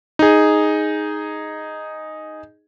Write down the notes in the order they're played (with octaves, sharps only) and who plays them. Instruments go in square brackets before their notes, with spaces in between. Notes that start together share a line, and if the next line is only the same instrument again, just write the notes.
[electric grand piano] D#4 G#4